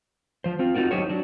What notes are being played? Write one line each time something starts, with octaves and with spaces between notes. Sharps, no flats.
F3 C5
C4 F4
C4 D#4 F4 F#4 A#4
F#3 D#4 G4 C5 C#5
F#3 D4